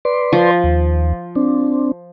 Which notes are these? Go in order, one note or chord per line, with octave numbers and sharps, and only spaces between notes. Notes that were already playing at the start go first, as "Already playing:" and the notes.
B4 D5 C6
F3
D#2
C4 D4